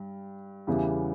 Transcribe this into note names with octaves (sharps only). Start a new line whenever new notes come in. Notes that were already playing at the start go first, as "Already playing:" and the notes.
Already playing: G2
E2 C#3 E3 G3 B3